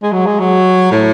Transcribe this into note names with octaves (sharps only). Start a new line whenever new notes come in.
G#3
F#3
G#3
F#3
A2